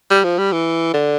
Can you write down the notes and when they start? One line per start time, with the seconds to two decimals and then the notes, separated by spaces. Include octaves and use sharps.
0.11 G3
0.24 F3
0.38 G3
0.52 E3
0.94 D3